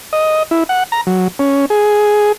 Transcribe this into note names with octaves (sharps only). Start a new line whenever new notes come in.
D#5
E4
F#5
A#5
F#3
C#4
G#4